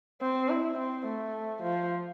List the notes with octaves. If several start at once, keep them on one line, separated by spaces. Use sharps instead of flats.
C4
E4
C4
A3
F3